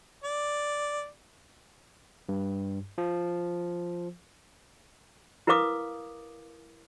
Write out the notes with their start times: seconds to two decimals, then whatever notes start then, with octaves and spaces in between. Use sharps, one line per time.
0.24 D5
2.29 G2
2.98 F3
5.47 E4 A#4 B4 F5 D6 D#6